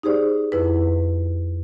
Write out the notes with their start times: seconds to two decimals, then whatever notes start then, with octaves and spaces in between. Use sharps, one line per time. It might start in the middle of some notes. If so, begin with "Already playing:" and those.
0.03 D#4 G4 G#4 C5 D5
0.52 F2 E4 B4